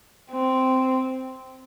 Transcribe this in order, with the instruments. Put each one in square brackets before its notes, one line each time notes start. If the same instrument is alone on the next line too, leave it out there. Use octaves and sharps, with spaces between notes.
[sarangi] C4